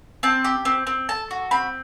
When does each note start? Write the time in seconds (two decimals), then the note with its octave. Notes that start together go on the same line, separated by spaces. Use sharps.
0.23 C4 A5
0.44 G4
0.65 C4
0.87 C4
1.09 A4 A5
1.31 F#4
1.51 C4 B5